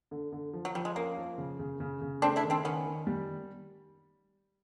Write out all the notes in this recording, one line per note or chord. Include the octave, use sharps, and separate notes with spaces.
D3
D3
F3
F#3
F3 G3
G#3
A#3 C#4
F3
C#3
C#3
C#3
C#3
A3 C4 D4
D4 E4
D#3
C4 D4
D#3 B3 C#4
D#3
G3